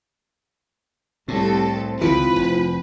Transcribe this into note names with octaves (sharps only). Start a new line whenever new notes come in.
C2 A2 C4 A4
C#2 D#3 E3 E4 F4 B4
F1